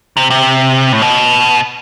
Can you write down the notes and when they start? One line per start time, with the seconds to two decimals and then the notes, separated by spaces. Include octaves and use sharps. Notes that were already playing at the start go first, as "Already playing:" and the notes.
0.17 C3
0.30 C3
0.92 A2
1.02 B2